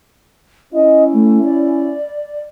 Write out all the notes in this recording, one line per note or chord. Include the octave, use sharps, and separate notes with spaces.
C#4 E4 D#5
A3
D5